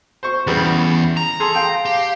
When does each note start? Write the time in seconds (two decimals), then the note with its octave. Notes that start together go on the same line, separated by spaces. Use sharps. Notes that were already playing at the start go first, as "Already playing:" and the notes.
0.23 C5 C#6
0.47 E2 C#3 G3 B3
1.17 A#5
1.40 G#4 A4 C6
1.55 F5 G5
1.86 G4